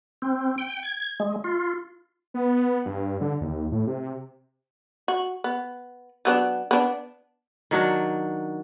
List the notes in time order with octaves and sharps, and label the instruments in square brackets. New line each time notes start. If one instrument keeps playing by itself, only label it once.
[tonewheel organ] C4
G5
G#6
G#3
F4
[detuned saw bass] B3
G2
D3
D#2
A2
C3
[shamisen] F#4
B3
F#3 B3 D4
B3 D4
[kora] D#3 F#3 D4